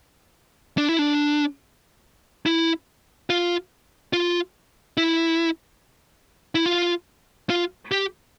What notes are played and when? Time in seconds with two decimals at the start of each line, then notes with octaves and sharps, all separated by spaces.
0.78 D4
0.89 E4
0.99 D4
2.46 E4
3.30 F4
4.13 F4
4.97 E4
6.55 E4
6.66 F4
7.50 F4
7.92 G4